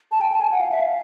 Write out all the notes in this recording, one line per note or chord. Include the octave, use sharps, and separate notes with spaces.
A5
G5
A5
G#5
F#5
F5
E5
F5